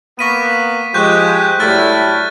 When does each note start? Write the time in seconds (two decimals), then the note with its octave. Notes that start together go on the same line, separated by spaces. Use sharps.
0.19 A#3 B3 C#6 B6 D#7
0.94 F3 G#3 G4 C#6 F#6 G6
1.60 A2 F#3 G3 A3 E4 F6 A6